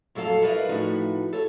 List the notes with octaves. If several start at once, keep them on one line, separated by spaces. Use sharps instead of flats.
F2 F#3 A4 F5 A5 A#5
E4 A#4 B4 D5 D#5 F5
A2 F3 D#4 F#4 B4
A4 C#5